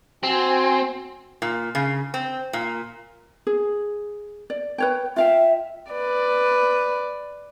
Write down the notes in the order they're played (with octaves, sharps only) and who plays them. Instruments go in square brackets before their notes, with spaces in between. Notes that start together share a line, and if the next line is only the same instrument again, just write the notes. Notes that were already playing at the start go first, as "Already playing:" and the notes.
[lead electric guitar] C4 [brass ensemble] F#4 G#5
[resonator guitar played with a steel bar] A#2
C#3
C4
A#2
[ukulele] G#4
D5
B4 C#5 G5
[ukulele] F4 F5 G5 [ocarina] E5
[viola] B4 D5